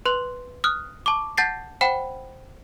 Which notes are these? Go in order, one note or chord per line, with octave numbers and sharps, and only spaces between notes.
B4 C6 F#6
D#6 F6 F#6
A5 C#6 D6
F#5 A5 G6 A6 A#6 C7
C5 F#5 G5 B5